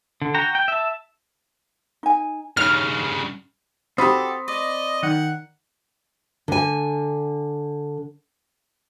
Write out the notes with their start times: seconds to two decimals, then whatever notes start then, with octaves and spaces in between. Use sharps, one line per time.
0.22 D3
0.34 F#4 G5 A#5
0.55 G5
0.68 E5 A5
2.03 D#4 G#5
2.57 G2 C#3 D#4 C#5 F6
3.98 C4 F#4 G4 A4 B5 D#6
4.48 D5 D#5
5.03 D#3 F#5
6.48 D3 G#5